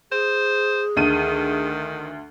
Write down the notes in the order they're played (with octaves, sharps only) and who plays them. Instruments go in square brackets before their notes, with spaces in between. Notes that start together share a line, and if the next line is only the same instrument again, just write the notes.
[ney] G#4 [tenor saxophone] C5
[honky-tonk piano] D2 D#7 [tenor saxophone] D#3